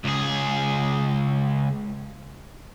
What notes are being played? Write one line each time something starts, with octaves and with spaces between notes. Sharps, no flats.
C#2 G#4